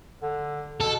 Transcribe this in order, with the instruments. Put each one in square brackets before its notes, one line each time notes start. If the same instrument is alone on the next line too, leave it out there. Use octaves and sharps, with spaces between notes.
[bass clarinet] D3
[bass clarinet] B2 [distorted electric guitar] A4